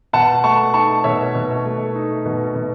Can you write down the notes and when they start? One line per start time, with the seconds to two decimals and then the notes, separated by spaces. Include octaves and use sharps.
0.13 B2 F#5 A5
0.44 A3 A5 C#6
0.74 D#4 A5 C#6
1.04 B2 C#5 E5
1.35 B2
1.65 A3
1.95 D#4
2.25 B2
2.55 B2